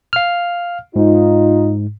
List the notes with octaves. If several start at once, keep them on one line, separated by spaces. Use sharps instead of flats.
F5 F6
G#2 D#4 F4